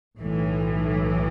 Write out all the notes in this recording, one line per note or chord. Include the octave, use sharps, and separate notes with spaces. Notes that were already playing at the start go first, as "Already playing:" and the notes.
B1 A2 E3